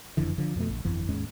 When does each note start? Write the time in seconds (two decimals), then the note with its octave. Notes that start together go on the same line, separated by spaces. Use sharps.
0.17 F#1 F2 D3 E3
0.38 D3 F3
0.56 F2 B2 G3 A3
0.70 A#1
0.85 G1 F2 E3
1.09 D#2 G#2 G#3 C#4